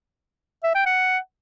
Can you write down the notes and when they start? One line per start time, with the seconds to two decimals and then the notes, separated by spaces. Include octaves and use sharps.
0.63 E5
0.74 G5
0.86 F#5